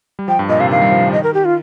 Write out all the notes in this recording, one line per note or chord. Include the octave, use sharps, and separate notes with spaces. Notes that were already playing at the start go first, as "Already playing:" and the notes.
G3
F3 G5
G2
A#2 D#5
C3 F5
D#3 F5
G3
F3
D#3
D#5
A#4
G4
F4